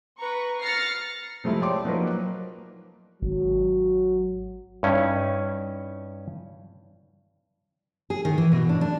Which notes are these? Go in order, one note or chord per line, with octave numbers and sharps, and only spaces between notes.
B4 A#5 C#6
F6 A6 A#6 C7 C#7
C3 F3 G#3 A3 E4
C#5 D5 G5 A5 C6 D6
F3 F#3 A#3 D#4 A#4 B4
G#1 F#3
G2 C#4 D#4 E4
G#4
D#3
E3
B2
D4
D4